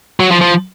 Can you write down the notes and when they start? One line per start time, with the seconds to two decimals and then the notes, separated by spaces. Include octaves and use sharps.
0.20 F#3
0.31 F3
0.41 F3